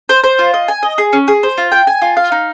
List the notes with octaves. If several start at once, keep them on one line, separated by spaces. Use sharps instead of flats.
C5
C5
F4
D#5
G#5
D#5
G#4
C#4
G#4
C5
F4
G5
G#5
F4
F5
D#4